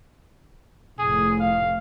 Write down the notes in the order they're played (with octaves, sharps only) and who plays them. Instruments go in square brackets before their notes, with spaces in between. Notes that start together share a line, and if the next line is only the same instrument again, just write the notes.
[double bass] F1 A2 [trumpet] G#4
[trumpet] F5